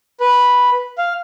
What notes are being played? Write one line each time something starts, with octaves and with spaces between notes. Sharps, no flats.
B4
F5